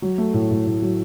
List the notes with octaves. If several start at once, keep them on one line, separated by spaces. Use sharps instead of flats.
F#3
A3
A2
A2
A2
F#3